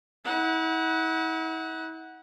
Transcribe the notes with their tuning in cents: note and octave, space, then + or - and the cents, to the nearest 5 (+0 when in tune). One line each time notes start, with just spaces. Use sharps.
E4 -40 F#5 +0